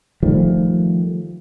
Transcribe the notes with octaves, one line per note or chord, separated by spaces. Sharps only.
D#3 F3 G3 A3